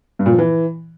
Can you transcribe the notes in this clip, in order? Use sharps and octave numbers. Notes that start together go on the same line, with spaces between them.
G2
A#2
F3
E3